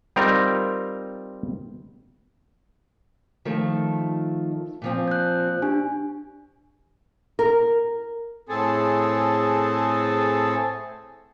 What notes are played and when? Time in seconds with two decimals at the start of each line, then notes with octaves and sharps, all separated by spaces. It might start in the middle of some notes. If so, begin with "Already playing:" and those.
0.16 G3 C4 D#4 F4 A#4 A#5
3.45 D#3 F3 A3
4.82 A#2 F3 C4
5.08 F#6 G6
5.62 D4 G4 G#5
7.39 A#4
8.49 A2 C4 G#4 A4